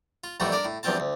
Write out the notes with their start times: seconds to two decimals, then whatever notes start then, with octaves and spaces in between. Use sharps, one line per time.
0.24 F4
0.40 A1 F2 A#2 G3 A3 F#4
0.52 D4 A#4 D5
0.65 A2
0.83 E2 G2 F3 C4 F4 A5
1.00 D2